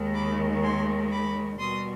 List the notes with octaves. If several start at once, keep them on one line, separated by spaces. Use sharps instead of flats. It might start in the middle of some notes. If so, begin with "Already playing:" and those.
Already playing: D#2 D#3 G#3
B5 D6
G#5 C6
B5 D6
B2 G3 C6 D#6